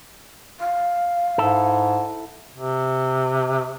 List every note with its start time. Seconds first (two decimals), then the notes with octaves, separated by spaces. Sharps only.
0.60 F5
1.38 G#2 E4 A4
2.54 C3